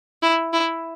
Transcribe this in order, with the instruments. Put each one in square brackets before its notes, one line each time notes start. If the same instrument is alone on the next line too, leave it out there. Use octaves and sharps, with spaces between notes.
[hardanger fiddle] E4
E4